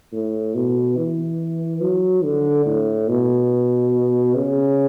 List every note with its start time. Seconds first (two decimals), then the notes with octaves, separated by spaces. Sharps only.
0.12 A2
0.54 B2
0.97 E3
1.81 F#3
2.24 D3
2.66 A2
3.08 B2
4.35 C#3